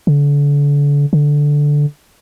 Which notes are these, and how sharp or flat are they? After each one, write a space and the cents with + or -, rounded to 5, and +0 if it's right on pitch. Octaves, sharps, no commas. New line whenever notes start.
D3 -35
D3 -5